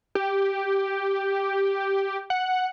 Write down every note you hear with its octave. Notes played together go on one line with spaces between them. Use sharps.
G4
F#5